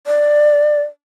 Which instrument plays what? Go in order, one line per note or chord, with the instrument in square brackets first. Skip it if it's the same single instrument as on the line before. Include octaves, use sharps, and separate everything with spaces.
[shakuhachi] D5